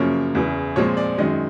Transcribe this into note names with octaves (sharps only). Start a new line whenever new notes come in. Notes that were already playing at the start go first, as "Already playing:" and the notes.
Already playing: F#2 C#3 F3 A#3 C#5
E2 C#3 E3
A#2 F3 G#3 C4 C#5
D5
F#2 D#3 G#3 D#5